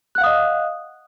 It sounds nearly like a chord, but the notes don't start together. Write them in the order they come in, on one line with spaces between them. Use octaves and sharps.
F#6 F#5 F5 D#6 D#5